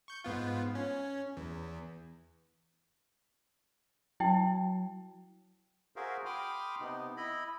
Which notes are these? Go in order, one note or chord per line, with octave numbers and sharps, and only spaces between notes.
C#6 G6
G#2 B3 F4
C#4
E2
F#3 E4 G5 A5
F#4 G#4 A#4 C5 E5 F5
G5 B5 C6 D6 D#6 F6
C3 B3 D#4
E4 D#5 B5